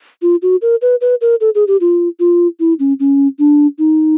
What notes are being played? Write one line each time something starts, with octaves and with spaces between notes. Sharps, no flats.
F4
F#4
A#4
B4
B4
A#4
A4
G#4
G4
F4
F4
E4
C#4
C#4
D4
D#4